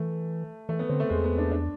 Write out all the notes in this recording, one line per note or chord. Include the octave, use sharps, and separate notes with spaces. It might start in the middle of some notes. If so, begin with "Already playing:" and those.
Already playing: E3 A3
E3 A3
B3
D3 C4
A3
E2 G#3
B3
D4
D4